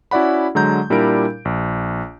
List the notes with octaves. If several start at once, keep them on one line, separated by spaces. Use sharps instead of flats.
C#4 E4 F#4 D5 F#5 B5
D3 F#3 G#3 A#5 G6
A#2 G3 D4 E4 A#4 D7
A#1